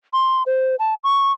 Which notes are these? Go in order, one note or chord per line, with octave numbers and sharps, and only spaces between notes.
C6
C5
A5
C#6